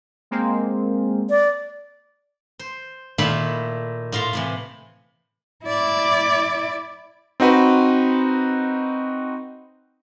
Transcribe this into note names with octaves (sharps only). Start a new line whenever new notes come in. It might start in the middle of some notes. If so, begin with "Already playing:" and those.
G#3 A#3 C4
D5
C5
A#2 D#3 A3 E4 F5 B5
A2 F4 A#5 C6
A2 C3 E3
E4 D5
C4 D#4 F#4 B4